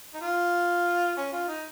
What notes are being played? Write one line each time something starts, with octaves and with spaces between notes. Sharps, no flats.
D#4
F4
C#4
F4
D#4